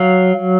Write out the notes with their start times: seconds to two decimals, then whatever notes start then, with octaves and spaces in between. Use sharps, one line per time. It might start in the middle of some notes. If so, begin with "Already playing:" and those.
Already playing: F#3 F5